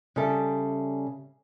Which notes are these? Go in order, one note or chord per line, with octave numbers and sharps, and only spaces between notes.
C#3 G3 A4 E5